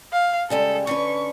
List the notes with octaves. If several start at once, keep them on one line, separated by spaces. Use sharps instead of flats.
F5
C#3 G3 G#3 A4
D3 C#4 B4 C#6